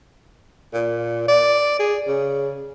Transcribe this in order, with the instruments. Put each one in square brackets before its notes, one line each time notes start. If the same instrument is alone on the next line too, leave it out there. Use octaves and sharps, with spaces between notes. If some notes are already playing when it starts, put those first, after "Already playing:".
[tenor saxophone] A#2
D5
G#4
C#3